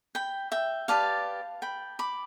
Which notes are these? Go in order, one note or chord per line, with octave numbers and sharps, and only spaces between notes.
G5 B5
E5 G5
G4 B4 D5 F5 A5
G5 B5
B5 D6